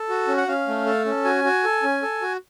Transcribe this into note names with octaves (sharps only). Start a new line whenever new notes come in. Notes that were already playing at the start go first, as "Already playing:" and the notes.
Already playing: A4
F#4
C#4
F#5
C#4 F5
A3
A4
C#4
F#4 G#5
F#4
A4
C#4
A4
F#4